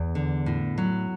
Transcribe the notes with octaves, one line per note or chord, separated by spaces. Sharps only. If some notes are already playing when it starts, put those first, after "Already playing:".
Already playing: E2
D3
A2
F#3